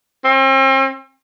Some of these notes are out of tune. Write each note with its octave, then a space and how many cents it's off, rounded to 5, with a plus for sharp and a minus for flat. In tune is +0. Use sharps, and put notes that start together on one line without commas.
C4 +40